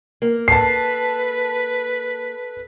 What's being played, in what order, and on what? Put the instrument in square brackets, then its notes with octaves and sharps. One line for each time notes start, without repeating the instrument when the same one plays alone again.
[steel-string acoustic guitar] A#3
[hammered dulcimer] A4 [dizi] B4 [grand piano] A5 C7